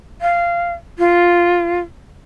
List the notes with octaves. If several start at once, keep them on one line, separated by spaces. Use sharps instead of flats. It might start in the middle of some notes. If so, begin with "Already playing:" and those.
F5
F4